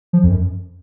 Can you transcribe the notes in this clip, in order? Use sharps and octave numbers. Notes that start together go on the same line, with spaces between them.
F3
F2
F#2